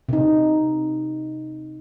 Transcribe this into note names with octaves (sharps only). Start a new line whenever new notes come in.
C3 D#4